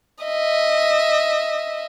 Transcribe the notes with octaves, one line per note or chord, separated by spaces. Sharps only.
D#5 E5